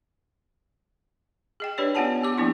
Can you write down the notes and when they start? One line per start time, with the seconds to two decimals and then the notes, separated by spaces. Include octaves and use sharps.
1.60 G#4 D#5 G5
1.78 D4 G4 B4 C#5 D5
1.95 B3 C#4 F4 F#5 G#5 A5
2.22 B3 G4 D6
2.38 F3 A#3 B3 D4 E4